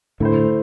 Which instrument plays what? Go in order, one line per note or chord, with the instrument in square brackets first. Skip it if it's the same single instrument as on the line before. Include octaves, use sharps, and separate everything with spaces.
[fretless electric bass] A2 D3 [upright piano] A3 E4 C5